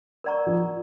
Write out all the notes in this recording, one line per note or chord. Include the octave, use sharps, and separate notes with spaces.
A#4 D5 F#5 A#5 C#6
F3